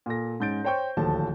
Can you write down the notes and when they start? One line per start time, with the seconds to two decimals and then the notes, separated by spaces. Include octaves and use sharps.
0.06 A#2 A4 A#6
0.40 G#2 C#4 G6 A6 D7
0.64 C5 C#5 G5 C#6 G6
0.97 D1 D#2 F3 A4 A5